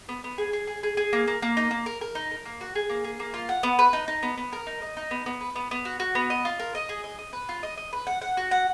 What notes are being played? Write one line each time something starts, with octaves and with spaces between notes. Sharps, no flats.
B3
B3
G#4
G#4
G#4
G#4
G#4
A#3
A#3
A#3
D#4
A#3
A#4
A#4
D#4
A#4
A#3
F#4
G#4
A#3
G#4
A#3
F4
F#5
B3
B4
D#4
D#4
B3
B3
A#4
D#4
D#5
D#4
B3
B3
B4
B3
B3
F#4
F#4
B3
D#5
F4
A#4
D#5
G#4
D#5
D#5
B4
F4
D#5
D#5
B4
F#5
F#5
F#4
F#5